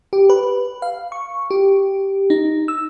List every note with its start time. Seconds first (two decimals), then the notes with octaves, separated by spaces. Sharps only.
0.13 G4
0.30 B4
0.82 F5
1.12 C#6
1.51 G4
2.30 D#4
2.68 E6